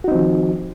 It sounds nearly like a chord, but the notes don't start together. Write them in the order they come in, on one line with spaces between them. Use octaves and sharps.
F#4 D#4 C4 F3 D#3